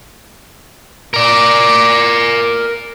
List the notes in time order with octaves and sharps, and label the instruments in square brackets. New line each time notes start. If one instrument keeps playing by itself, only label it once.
[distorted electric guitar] A#4 D5